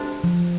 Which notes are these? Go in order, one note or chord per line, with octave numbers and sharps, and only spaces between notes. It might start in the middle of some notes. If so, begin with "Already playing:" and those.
Already playing: D2 C3 G#3 D4
F3